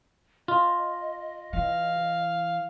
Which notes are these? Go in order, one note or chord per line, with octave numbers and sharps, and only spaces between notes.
F4 D#5
E3 F5